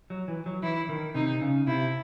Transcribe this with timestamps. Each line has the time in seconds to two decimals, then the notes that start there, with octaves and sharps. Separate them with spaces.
0.10 F#3
0.28 E3
0.46 F#3
0.63 E3 E4
0.89 D#3
1.15 C3 D#4
1.41 C#3
1.67 C3 E4